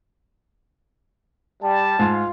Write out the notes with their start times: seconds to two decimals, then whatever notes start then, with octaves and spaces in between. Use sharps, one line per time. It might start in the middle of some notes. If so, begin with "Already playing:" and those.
1.63 G3 A5
1.99 G#2 F4